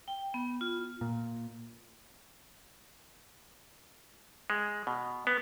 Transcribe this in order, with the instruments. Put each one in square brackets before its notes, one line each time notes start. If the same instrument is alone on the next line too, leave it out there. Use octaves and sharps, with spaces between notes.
[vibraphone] G5
B3
F4
[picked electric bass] A#2
[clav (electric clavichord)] G#3
B2
B3